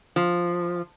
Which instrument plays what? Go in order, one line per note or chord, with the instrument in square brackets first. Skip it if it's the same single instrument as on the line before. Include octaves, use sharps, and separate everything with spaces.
[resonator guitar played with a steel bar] F3